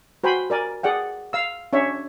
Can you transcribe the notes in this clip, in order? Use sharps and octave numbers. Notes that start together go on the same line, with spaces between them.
F#4 C5 G5 G#5 B5
A#4 D5 G#5
G#4 D5 F#5 G5
F5 E6
C#4 D4 C#5 E5